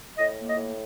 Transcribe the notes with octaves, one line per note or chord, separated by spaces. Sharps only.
A2 D#5
A#3
D#5
A2